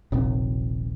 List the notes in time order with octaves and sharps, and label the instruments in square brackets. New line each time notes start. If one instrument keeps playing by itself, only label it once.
[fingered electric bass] D#1 A#1 C3